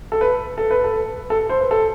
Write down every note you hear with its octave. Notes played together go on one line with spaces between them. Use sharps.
A4
B4
A4
B4
A4
A4
C5
B4
A4